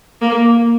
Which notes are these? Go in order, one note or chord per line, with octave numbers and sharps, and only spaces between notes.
A#3